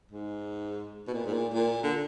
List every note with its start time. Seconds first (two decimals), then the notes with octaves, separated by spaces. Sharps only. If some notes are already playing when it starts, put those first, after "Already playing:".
0.11 G#2
1.08 B2
1.14 A#2
1.27 G#2
1.33 A#2
1.54 A#2
1.83 D3